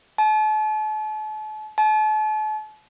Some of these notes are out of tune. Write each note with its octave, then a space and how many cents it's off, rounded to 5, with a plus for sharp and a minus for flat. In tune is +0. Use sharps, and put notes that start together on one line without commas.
A5 -40
A5 -40